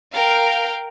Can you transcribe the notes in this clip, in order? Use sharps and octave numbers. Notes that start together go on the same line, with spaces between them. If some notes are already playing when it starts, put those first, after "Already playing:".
A#4 F5 G5